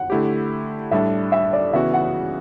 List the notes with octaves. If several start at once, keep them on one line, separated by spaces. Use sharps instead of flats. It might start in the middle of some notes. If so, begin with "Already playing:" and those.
Already playing: F#5
D3 A3 E4 G4
A2 G3 D4 A4 E5
E5
D5
C#3 E3 B3 F#4 E5
F#5